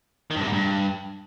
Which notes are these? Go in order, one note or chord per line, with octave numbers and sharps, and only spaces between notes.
D#3
G2
C3
G#2
G2